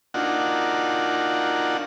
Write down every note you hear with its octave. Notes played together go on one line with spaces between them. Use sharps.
A#3 D4 D#4 F4 F#4 F#5